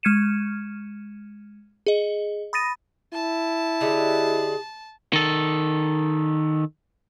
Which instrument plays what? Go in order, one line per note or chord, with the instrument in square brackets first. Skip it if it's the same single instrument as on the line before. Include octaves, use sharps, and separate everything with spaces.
[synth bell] G#3 F6 G#6 C#7 D#7 E7
G#4 D#5
B5 D#6 A6 A#6 D#7
[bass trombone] E4 [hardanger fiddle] A5
[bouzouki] D3 G4 D#5 [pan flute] G#4
[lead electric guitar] D#3 A4